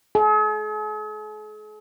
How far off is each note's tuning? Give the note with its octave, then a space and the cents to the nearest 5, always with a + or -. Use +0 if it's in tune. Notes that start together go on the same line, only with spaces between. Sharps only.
G#4 +45